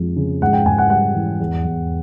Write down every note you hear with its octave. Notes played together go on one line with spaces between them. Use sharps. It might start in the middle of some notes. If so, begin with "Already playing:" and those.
Already playing: F2 F3 G#3
C#3
G#2 F#5
G5
G#2 G#5
F#5
G3 F#5
E3
E2
E2